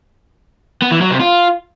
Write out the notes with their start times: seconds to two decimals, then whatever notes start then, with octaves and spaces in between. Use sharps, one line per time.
0.82 B3
0.91 E3
1.01 F#3
1.11 C3
1.20 F4